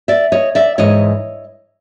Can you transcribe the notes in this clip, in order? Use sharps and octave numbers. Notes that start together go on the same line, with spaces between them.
D5 E5
C#5 D#5
D5 E5
G#2 E3 C#5 D#5